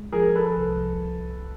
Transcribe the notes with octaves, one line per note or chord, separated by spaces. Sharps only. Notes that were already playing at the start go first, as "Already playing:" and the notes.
Already playing: G#3
F3 G#4 A#4
A4 B4
C2